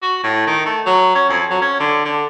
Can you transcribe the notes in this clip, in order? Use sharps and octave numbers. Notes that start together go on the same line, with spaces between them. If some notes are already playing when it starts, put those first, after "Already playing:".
F#4
A2
D#3
A3
F#3
C#4
F2
F#3
C#4
D3
D3